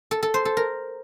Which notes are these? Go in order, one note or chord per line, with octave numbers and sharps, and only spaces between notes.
A4
A4
C5
A4
A#4